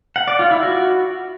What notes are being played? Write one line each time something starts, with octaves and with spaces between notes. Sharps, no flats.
F#5
D5
F4
E4
F#4